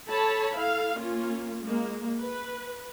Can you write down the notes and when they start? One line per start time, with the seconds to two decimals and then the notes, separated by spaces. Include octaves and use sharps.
0.10 A4 C#5 A5 B5
0.56 E4 A4 F5
0.97 A#3 C#4 F4
1.62 G#3 A#3
2.20 B4